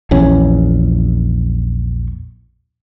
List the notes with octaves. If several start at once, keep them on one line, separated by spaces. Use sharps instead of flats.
A#1 E2 C#4